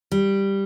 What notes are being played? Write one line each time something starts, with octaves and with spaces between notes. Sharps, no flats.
G3